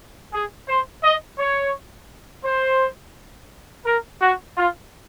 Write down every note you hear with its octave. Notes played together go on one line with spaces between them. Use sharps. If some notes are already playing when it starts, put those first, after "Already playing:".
G#4
C5
D#5
C#5
C5
A#4
F#4
F4